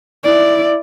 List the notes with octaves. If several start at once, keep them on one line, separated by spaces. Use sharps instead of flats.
E4 D5